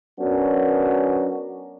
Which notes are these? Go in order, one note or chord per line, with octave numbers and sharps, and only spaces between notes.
F#3 B3 C#4 D4 F#4 A#4